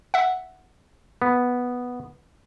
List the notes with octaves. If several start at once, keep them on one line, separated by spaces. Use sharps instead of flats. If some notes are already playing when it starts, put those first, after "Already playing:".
E5 F#5
B3